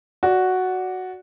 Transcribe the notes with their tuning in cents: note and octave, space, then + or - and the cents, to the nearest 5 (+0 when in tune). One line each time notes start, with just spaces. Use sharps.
F#4 +0 D5 -15